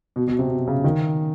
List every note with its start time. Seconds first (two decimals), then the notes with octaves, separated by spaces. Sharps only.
0.16 B2
0.28 B2
0.39 C3
0.50 B2
0.67 C#3
0.84 D#3